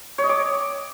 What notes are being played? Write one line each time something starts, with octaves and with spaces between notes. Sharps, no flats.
C#5
D#5
D6